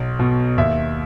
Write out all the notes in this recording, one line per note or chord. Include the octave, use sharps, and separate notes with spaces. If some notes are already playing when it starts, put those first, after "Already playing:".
Already playing: B1
B2
D#2 E5